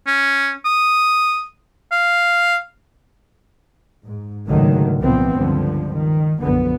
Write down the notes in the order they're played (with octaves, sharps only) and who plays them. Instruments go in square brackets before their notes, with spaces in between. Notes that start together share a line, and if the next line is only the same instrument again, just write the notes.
[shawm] C#4
D#6
F5
[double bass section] G#2
C#2 G#2 D3 D#3 F#3 A3
C2 A#2 E3 F3 B3 C4
C#2 G2 D3 F3
D#3
B1 F#2 D3 F3 B3